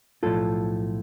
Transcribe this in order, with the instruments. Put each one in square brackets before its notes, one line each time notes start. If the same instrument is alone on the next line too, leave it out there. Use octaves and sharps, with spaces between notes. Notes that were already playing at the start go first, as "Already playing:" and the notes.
[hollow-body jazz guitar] B1 A2 F3 F4 A4